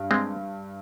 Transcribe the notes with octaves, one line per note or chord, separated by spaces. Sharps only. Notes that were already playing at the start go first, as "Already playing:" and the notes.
Already playing: G2
G#3 C4